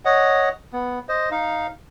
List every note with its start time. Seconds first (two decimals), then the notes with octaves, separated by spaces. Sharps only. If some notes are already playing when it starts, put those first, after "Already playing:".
0.05 C#5 D#5 F#5
0.73 B3
1.09 C5 D#5
1.31 D#4 F5